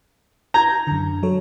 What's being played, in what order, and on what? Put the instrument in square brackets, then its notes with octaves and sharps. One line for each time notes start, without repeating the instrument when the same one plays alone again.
[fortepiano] A#5 [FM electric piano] G6 G#6 A#6
[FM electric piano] F#2 D3
F#3 A4 C#5